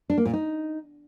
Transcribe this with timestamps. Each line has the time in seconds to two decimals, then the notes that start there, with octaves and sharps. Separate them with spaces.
0.10 D4
0.18 A#3
0.25 A#2
0.33 D#4